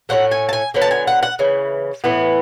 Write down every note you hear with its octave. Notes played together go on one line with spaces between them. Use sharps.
A2 F#3 A3 F#5
G#5
A5
G#5
D3 F#3 B3
A5
G#5
F#5
F#5
C#3 E3
A2 E3 B3